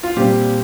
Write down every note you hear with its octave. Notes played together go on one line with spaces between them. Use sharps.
F4
A#2 G3 C4 G4